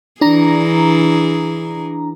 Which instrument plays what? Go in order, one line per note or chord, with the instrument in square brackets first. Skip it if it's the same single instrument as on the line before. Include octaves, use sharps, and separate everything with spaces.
[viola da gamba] E3 G#4 [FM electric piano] D4 A#5